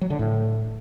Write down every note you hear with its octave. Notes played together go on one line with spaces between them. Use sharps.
F#3
D3
A2